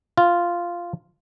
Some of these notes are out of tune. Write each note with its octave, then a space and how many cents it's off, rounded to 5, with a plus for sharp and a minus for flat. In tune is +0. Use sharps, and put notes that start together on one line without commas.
F4 -5